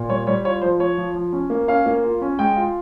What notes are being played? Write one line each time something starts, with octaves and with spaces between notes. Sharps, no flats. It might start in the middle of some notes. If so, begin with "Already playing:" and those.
Already playing: A#2
G3 C#5
G3 C#5
F4 C#5
F3 C5
F3 C#5
F3
F3
C#4
A#3
C#4 F5
A#3
F4
C#4
G#3 G5
F4